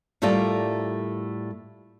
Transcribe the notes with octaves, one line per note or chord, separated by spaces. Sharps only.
A2 G3 A3 F4 A#4 D5